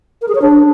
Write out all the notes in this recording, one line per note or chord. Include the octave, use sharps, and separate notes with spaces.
A#4
G#4
C#5
D4